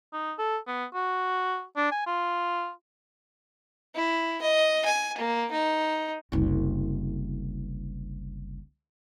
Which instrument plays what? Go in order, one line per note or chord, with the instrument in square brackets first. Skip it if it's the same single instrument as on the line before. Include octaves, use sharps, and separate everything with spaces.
[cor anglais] D#4
A4
B3
F#4
D4
G#5
F4
[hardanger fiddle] E4
D#5
G#5
A#3
D#4
[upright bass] F#1 C2